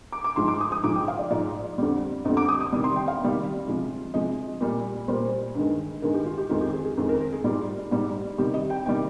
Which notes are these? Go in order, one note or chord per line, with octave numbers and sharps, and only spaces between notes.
D6
D6
G#2 F3 G#3 C6
D6
D#6
D#6
G#2 F3 G#3 D6
G5
F5
D5
G#2 F3 G#3 D5
F2 D3 G3
F2 D3 G3 D#5
D6
D#6
D#6
C3 D#3 G3
C6
G5
F5
C3 D#3 G3
C3 F3 G#3
C3 F3 G#3 D#5
A#2 G3
A#2 G3 C5
G2 D#3 G#3
G2 D#3 G#3 A#4
G4
F4
G4
F2 D#3 G#3 F4
G4
G#4
G#4
F2 D#3 G#3
A#4
A#4
G#4
G#2 G3 F4
G#2 G3
C3 D#3 G3 G4
D#5
G5
C3 D#3 G3 G5